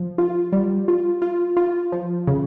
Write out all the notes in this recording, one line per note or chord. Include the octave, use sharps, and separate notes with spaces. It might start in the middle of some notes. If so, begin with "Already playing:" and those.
Already playing: F3
F4
G3
F4
F4
F4
F3
C#3